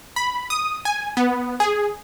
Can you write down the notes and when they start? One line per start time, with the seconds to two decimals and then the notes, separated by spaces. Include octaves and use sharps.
0.16 B5
0.50 D#6
0.85 G#5
1.17 B3
1.60 G#4